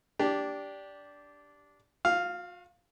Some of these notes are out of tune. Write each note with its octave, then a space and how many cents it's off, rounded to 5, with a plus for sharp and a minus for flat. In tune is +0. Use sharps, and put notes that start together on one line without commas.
D4 -15 G4 +0
F#4 -45 F5 +0